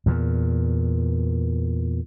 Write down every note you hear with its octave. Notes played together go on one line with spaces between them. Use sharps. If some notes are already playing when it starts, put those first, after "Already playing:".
E2 A#2